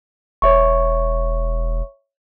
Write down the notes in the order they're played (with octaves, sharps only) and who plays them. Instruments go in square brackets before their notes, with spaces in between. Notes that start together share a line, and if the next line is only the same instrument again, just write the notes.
[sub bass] E1 [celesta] C#5 E5 C#6